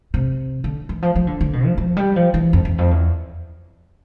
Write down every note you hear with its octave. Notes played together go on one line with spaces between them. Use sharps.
C3
D3
E3
F3
F3
D3
D3
B2
F3
F3
G3
F3
E3
F2
E2
F2
E2